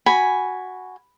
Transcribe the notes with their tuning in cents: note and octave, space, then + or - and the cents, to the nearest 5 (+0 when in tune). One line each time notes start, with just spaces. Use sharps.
F#4 +0 G#5 +0 B5 +0